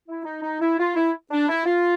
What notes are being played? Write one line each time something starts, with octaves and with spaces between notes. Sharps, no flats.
E4
D#4
D#4
E4
F4
E4
D4
E4
F4